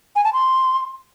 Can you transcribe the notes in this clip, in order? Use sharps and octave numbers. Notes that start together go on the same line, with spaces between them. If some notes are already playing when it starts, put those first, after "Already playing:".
G#5
A5
C6